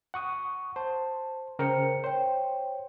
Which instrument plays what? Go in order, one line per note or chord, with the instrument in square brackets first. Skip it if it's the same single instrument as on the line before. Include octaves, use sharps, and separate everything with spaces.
[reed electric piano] F#5 C#6 D#6
[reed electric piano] C5 [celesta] A5
[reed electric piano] C#3 A#4 G5 [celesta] C5 C#7
[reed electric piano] C5 [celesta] C#5 G5